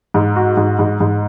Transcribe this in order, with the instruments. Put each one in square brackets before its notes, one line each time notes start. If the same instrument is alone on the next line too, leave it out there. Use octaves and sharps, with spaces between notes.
[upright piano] G#2
F#4
G#2
G#2
G#2